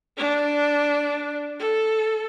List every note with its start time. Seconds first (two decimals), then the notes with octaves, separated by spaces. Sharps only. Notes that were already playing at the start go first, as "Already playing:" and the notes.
0.17 D4
1.59 A4